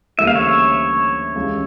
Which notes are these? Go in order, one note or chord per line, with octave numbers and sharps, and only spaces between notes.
D2 C#3 E3 G3 A#3 E5
F5
C#5 E5
C#2 C#3 E3 G3 C#4